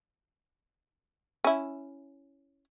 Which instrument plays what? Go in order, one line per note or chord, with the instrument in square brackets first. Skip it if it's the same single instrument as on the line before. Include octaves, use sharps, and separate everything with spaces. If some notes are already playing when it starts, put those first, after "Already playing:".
[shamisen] C#4 E4